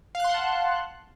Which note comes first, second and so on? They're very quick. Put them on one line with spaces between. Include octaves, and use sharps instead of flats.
F5 F#6 C6 F#5 A5